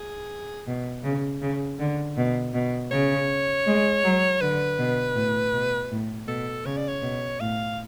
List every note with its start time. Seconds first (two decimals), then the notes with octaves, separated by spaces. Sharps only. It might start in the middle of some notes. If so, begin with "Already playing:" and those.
Already playing: G#4
0.67 B2
1.04 C#3
1.41 C#3
1.79 D3
2.17 B2
2.54 B2
2.91 C#3 C#5
3.67 G#3
4.04 F#3
4.41 D3 B4
4.79 B2
5.15 A2
5.53 B2
5.91 A2
6.28 B2 A4
6.65 C#3 C#5
6.77 D5
6.88 C#5
7.02 B2
7.40 A2 F5